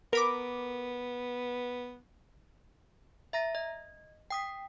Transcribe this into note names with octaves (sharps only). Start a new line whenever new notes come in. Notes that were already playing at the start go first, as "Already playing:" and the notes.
B3 A#4 B5 D6
E5 A#5 A#6
D#5
G5 D#6 B6